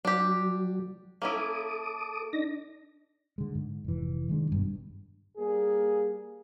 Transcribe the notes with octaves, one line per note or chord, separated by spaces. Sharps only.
F#3 D4 G4
A#3 C#4 E4 A4 D6 D#6
D4 D#4 A#6
D3 G#3
G#2
F1 E3
D#3 G#3 D4
G1 G2 B2
G3 A#3 G#4